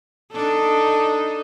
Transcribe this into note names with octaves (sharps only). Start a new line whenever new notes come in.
D4 D#4 A4